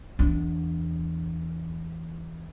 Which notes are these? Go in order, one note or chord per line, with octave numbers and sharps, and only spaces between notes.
E2 D4